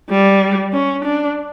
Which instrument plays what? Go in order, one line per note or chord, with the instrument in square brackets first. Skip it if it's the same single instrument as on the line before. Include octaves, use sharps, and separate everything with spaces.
[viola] G3
C#4
D4